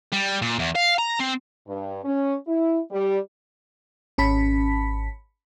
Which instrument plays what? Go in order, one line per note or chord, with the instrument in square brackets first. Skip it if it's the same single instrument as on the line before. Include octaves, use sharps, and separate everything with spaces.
[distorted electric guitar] G3
A#2
E2
F5
A#5
C4
[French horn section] G2
C#4
E4
G3
[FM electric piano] G#1 C#4 A5 B5 B6